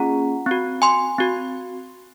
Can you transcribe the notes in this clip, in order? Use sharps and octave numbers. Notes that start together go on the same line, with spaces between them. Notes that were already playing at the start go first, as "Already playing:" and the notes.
Already playing: A#3 C#4 F4 G#4 F#5 A#5
C4 F#4
G#5 C6
C4 F#4